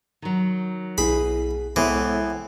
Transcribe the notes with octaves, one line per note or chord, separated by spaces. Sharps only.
D#3 F#3
B1 B2 E4 G#4 B5
C2 A2 E3 G#3 B3 C5